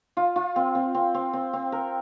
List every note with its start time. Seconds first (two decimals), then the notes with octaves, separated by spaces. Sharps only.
0.17 F4
0.36 F4
0.56 C4
0.75 C4
0.95 C4
1.14 C4
1.33 C4
1.53 C4
1.72 A#4